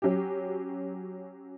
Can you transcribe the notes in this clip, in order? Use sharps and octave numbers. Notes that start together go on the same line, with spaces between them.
F#3 C#4 G4